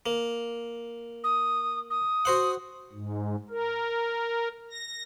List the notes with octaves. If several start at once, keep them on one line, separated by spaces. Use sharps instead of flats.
A#3
D#6
D#6
F#4 C5 F#5
G#2
A#4
A#6